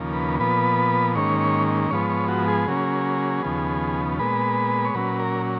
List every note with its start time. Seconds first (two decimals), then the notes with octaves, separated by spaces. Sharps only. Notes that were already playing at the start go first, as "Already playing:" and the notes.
Already playing: D#2 C#3 F3 A#3
0.13 B4
0.39 A#2 F3 B3 B4
1.15 G#2 D#3 A#3 C#4 C#5
1.40 C#5
1.91 G#2 F3 B3 C#5
2.10 C#5
2.28 F#4
2.48 G#4
2.67 C#3 F#3 A#3 C#4
3.42 D#2 C#3 F3 B3
4.19 A#2 G#3 B3 B4
4.85 C#5
4.94 A#2 F#3 C#4 B4
5.20 A#4